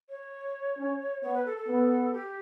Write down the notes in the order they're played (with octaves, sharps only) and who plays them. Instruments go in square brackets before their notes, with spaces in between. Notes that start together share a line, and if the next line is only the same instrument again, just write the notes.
[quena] C#5
[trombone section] C#4
[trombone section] B3 [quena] C#5
[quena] B4
A4
A4
[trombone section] B3
[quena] G4